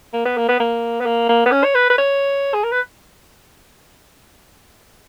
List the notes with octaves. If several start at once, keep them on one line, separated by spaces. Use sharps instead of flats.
A#3
B3
A#3
B3
A#3
B3
A#3
A#3
B3
C#4
C#5
B4
B4
C#5
G#4
A#4
B4